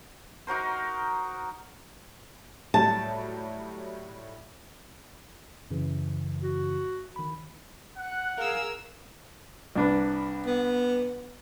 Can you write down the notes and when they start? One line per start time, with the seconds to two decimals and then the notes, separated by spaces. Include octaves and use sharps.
0.47 D#4 F#4 A#4 C5
2.74 A2 F#3 G3 A5
5.71 F#2 C#3 E3
6.42 F#4
7.16 D#3 B5
7.98 F#5 F#6
8.37 G#4 A#4 F5 E6 F6
9.76 C2 D4 B4
10.46 B3